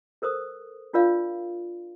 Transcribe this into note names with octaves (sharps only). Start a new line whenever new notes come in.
A4 A#4 C5 D#6
D4 F4 A#4 D5 F5